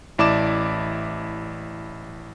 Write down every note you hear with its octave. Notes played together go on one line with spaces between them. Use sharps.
A1 E4 D5 A5 D6 E7